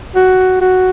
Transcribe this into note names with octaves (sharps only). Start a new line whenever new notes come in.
F#4
F#4